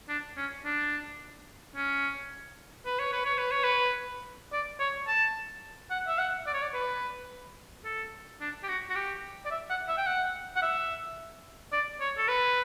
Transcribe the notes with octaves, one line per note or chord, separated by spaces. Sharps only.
D4
C#4
D4
C#4
B4
C#5
B4
C#5
B4
C#5
B4
D5
C#5
A5
F#5
E5
F#5
D5
C#5
D5
B4
A4
D4
G4
F#4
F#4
G4
D5
E5
F#5
E5
G5
F#5
F#5
E5
D5
C#5
A4
B4